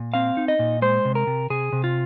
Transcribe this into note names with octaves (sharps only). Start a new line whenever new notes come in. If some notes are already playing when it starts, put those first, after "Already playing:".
Already playing: A#2
C4 F5
D#4
D#5
A#2
G#3 C5
C3
A#4
C3
C3 G#4
C3
F4